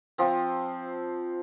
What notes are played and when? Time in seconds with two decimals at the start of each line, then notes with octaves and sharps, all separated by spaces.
0.18 F3 C4